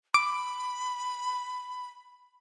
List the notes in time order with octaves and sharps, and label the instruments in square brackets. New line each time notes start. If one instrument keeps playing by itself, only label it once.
[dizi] B5 [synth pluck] D6